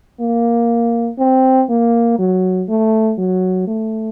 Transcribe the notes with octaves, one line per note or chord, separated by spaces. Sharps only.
A#3
C4
A#3
F#3
A3
F#3
A3